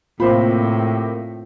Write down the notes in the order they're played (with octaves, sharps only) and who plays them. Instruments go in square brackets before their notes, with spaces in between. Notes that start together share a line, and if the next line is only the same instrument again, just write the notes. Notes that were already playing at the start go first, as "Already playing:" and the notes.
[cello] A2 [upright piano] C3 C5 B5 [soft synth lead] A#3 [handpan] C4 F4